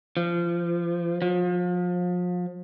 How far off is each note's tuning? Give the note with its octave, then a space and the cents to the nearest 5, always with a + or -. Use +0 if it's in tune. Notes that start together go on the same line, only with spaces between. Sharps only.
F3 -25
F3 +35